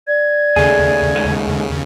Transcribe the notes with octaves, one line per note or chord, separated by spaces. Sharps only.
D5 G#6
D#2 C#3 A3 G#4
G#2 G#3 A3